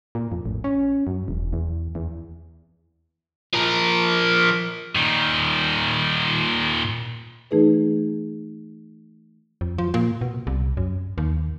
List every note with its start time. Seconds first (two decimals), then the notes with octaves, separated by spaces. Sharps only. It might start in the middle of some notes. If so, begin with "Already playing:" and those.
0.15 A#2
0.32 F2
0.46 A1
0.64 C#4
1.07 F#2
1.28 E1
1.53 E2
1.95 E2
3.53 F3 A#4
4.96 A#2 D#3
7.51 E3 A3 D#4 G#4 B4
9.61 F2
9.78 F3
9.94 A#2
10.21 B2
10.47 C2
10.77 F#2
11.18 D#2